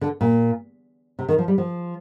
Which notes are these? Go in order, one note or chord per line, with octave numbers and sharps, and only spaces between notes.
D3
A#2
C3
D#3
F3
G3
F3